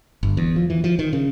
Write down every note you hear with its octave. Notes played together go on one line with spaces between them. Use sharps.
G1
E2
F3
E3
F3
D#3
C#3